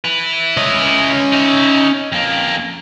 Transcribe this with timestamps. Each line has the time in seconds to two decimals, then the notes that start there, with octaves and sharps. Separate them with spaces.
0.04 E4 B4
0.57 C#4 D#5
1.32 D#4 E5
2.12 F2 A#3